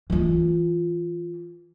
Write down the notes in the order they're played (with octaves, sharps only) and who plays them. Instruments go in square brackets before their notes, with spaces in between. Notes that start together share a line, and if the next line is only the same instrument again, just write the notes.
[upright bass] E3 F4